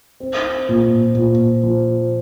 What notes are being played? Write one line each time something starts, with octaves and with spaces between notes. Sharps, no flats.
C4
A#2
A#2
F3